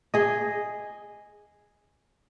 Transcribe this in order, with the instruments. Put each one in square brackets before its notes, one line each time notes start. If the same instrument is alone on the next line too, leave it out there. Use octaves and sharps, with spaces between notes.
[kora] G#4 D#5